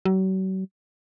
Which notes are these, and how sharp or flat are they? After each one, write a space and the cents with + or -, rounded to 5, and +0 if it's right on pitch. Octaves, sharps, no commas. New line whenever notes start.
F#3 +40